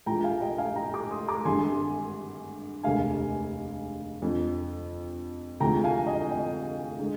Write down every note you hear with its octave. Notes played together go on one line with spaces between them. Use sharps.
A#1 A#2 F3 G#3 G5 A#5
F5 G#5
D#5 G5
F5 G#5
G5 A#5
A#5 D6
C6 D#6
A#5 D6
G#1 G2 D3 G#3 G#5 C6
F1 D#2 D3 G#3 F5 G#5
F2 D3 F3
D2 C3 F3 G#3 G5 A#5
F5 G#5
D#5 G5
D#5 G5
D3 G#3